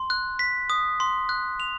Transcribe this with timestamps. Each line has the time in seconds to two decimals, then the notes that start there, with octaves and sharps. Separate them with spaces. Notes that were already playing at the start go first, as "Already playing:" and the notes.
Already playing: C6
0.10 F#6
0.39 B6
0.70 D#6
1.00 C6
1.29 F#6
1.60 F7